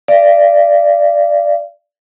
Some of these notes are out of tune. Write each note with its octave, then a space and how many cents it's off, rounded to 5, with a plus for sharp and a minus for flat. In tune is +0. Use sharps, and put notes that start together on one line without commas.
D5 +0 F5 -40